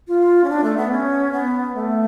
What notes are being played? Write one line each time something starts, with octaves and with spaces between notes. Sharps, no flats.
F4
C#4
D4
A3
B3
C#4
B3
A3